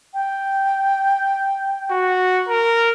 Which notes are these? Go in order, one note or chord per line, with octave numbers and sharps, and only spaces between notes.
G5
F#4
A#4